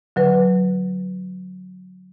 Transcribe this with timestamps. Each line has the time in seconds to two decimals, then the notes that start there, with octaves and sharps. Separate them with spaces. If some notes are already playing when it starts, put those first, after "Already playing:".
0.16 D3 F#3 B4